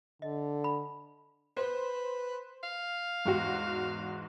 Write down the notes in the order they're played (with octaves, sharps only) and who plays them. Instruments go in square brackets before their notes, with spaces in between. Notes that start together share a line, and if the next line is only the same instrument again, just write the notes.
[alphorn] D3 [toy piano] D#5
[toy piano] B5
[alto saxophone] B4 [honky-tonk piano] C5
[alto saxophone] F5
[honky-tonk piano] E2 G#2 F#4